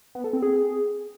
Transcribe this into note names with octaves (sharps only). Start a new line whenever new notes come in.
B3
A4
C4
G#4